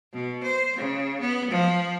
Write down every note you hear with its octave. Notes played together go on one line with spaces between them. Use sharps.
B2
C5
C#3
B3
F3